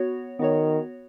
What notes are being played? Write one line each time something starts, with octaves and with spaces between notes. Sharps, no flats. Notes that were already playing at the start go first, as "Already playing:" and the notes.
Already playing: B3 F#4 C#5
D#3 B3 F#4 C#5